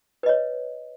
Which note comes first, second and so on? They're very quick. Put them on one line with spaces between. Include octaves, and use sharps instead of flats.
B4 D#5 C#5